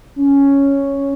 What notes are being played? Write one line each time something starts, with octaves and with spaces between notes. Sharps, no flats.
C#4